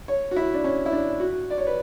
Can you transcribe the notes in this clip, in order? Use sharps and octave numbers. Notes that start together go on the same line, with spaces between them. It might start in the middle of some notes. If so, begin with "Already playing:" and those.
C#5
F#4
E4
D4
C#4
E4
D4
F#4
D5
C#5
B4